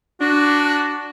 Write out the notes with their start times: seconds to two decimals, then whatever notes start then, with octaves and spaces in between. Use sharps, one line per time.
0.21 D4 F#4